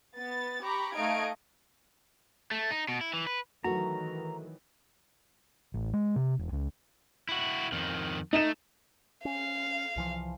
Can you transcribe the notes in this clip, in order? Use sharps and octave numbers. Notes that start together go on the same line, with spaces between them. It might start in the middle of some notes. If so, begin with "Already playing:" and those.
B3 A6
G4 A#5 B5 C#6 D6
A3 D#4 D#5 F5 G#6 D7
A3
D#4
B2
E4
E3
B4
D#3 E3 F#3 A3 F#4 A#5
A1
G#3
C3
E1
C#2
E4 F#4
F2 D#3
A3 D#4 E7
C#4 F5
C2 E3 F3